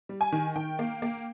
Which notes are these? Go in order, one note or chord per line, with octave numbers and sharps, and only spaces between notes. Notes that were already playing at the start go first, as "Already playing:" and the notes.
G3
G#5
D#3
D#3 G5
A#3
A#3